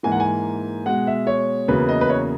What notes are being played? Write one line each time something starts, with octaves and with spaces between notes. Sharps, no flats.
G#2 E3 A#3 G#5
F#5
G#5
B2 G#3 F#5
E5
C#5
E2 C#3 F#3 A#3 B4
D#5
B4
C#5